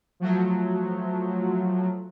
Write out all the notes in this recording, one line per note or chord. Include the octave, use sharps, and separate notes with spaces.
F3 F#3 A3